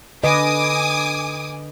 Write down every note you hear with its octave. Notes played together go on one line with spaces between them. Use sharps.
D3 B4 D#5 G#5 D6 D#6